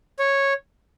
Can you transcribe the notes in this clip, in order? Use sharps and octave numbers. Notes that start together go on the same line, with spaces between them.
C#5